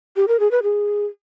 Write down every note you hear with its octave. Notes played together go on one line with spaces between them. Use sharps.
G4
A#4
G#4
B4
G#4